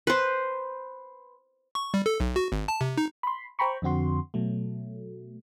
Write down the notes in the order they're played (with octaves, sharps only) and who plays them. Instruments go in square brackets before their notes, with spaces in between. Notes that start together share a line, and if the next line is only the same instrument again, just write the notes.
[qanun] B4 C5
[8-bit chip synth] C#6
G3
A4
B1
F#4
G#1
A5
C3
D#4
[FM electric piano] B5 C6
C5 G5 A#5 B5 C#6
F2 D3 C4 F#4 C6
B2 F#3 A3